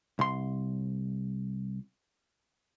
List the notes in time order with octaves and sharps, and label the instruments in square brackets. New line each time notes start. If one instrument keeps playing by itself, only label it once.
[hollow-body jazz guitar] C2 C6